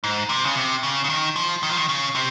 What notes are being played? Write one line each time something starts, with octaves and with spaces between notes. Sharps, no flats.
G#2
C3
C#3
C3
C#3
C#3
D#3
F3
D#3
F3
D#3
C#3
C3